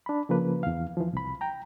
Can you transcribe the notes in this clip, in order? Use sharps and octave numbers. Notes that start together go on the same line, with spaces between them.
D4 B5
C#3 F3 A#3 B4
E2 F5
E3 F3
C2 B5
G5 A#5